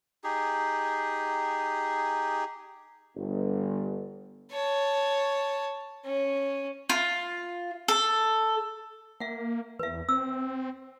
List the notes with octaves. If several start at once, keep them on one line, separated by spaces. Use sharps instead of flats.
D#4 G4 G#4
G1
C#5 A5
C#4
F4
A4
A#3 E5 F#5
E2 B4 E5
C4 E6